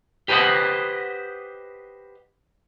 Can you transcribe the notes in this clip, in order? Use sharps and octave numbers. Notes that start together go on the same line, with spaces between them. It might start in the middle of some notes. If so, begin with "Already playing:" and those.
G4 B4 C5 D#5 F#5